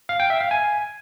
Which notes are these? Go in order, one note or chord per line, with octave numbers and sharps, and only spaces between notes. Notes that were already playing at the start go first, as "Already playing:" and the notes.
F5
G5
E5
F5
G#5